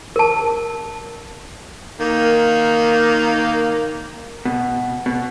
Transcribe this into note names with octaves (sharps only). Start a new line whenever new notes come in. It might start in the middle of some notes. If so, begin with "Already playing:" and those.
A#4 A5
D#3 A#3
B2
B2